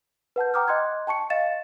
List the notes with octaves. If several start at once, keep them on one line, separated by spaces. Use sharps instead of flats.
B4 F#5 A5 G6
F#5 G5 A#5 D6 D#6 F6
D#5 G5 C6 F#6 G#6
G5 A5 C#6 C#7
D#5 F5 A6 E7